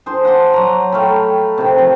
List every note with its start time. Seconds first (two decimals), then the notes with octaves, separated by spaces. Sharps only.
0.06 G#4 C5 A5 C6
0.25 F#5 A5 C6 D6
0.53 F#3 A#5
0.92 A3 F5 G5 B5
1.58 C3 D#3
1.78 F3